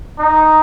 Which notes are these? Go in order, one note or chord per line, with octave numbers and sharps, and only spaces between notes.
D#4